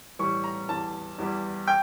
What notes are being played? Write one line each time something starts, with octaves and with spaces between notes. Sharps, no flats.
A2 E3 G3 C#6
A#5
E2 E3 G3 A5
E2 E3 G3
G5